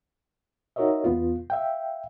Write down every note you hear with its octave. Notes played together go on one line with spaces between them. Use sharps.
D#4 F#4 A#4 C#5 D#5 E5
E2 B3 F4
E5 F5 G5